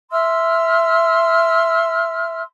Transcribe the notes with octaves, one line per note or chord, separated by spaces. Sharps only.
E5 C6 E6 F6